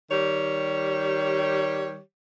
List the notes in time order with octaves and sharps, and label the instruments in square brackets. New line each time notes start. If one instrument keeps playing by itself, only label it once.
[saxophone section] D#3 G3 G4 C#5